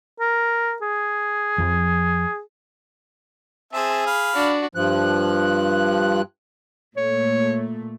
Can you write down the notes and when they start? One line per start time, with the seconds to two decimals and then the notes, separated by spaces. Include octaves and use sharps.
0.20 A#4
0.82 G#4
1.58 F2 F3
3.73 C4 G#4 E5 A5
4.07 F5 B5
4.35 D4 F#4
4.75 G2 F3 F#6
6.97 A#2 A3 C#5